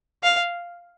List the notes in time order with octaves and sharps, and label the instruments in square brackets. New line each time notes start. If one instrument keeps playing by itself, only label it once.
[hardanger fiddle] F5